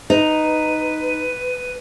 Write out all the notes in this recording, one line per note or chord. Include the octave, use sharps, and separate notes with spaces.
D#4 B4